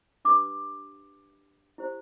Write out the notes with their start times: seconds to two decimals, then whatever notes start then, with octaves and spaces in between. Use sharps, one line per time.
0.25 D4 G4 B4 D6
1.78 E4 G4 C5